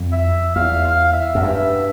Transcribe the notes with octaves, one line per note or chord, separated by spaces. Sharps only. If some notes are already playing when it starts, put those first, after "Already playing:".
Already playing: F2
E5
E2 F5
F5
E5
F#2
G2 E5